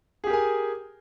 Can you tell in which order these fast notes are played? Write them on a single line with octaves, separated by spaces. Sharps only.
G#4 G4 A#4 G#5